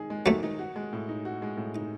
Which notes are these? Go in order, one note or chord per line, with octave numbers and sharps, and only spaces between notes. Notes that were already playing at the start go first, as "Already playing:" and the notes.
Already playing: D#3 G#3 D#4 G#4
G#3
D#3 F#3 A3
D#4
F#4
G#3
A2
D#4
F#4
G#3
A2
D#4